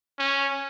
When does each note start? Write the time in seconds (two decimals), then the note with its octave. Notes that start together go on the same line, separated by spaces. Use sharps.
0.19 C#4